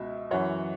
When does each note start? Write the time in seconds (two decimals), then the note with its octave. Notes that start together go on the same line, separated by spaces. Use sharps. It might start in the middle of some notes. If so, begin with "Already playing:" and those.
Already playing: C#2 B2 E5
0.31 F#2 E3 C#5 F#5